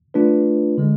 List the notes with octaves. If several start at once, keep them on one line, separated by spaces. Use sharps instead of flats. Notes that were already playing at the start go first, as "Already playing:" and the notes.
A3 D4 F4 B4
D3 G#3